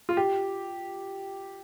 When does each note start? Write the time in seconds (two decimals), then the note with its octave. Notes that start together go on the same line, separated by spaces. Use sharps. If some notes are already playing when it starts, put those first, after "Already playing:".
0.09 F4
0.17 G4